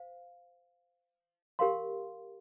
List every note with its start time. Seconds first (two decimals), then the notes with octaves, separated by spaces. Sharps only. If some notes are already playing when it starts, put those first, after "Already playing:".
Already playing: C5 F5
1.59 G4 A#4 F5 C6